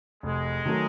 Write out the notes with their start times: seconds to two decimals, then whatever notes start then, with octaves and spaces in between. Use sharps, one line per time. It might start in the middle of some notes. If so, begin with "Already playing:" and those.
0.23 F1 G#3
0.65 D#3 F#3 A3